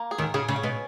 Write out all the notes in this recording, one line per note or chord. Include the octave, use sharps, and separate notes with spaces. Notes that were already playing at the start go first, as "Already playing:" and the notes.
Already playing: A#3
G#4
D#2 D#3
C#3 G#4
C#3
C#4
B2